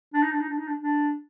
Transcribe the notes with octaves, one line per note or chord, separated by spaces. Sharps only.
D4
D#4
D4
D#4
D4
D#4
D4
D4